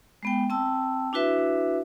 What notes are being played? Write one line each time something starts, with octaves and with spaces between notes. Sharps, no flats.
G#3 B3 G5
C4 G5 A5 E6
D4 E4 F#4 B4 E5